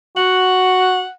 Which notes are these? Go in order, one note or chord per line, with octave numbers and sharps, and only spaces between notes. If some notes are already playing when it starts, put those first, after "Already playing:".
F#4 F#5